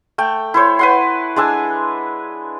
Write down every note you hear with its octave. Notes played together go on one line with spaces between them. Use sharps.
A3 G5
E4 C5 C#5
B4 F#5 C6
G#3 D4 G#5 E6